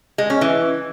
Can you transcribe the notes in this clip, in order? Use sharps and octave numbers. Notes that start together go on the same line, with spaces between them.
G#3
C#4
E3